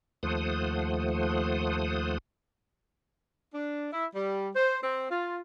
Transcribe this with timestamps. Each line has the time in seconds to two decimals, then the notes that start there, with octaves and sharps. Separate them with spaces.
0.23 D#2 F3 A3 C5 F#5 D#6
3.54 D4
3.93 E4
4.14 G3
4.56 C5
4.83 C4
5.10 F4